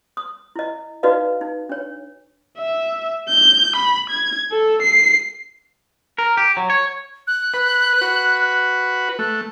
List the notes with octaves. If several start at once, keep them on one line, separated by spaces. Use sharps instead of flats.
D#6
E4 D#5
D#4 F#4 B4 D5 D#5 F5
D#4
D4 C#5
E5
G6
B5
G#6
A4
C7
A#4
G4
F#3
C#5
F#6
B4
F#4 B4
A3 F#6